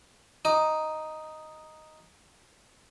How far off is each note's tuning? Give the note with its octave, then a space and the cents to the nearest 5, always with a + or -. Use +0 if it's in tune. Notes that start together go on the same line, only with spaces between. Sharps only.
D#4 +0 D6 +40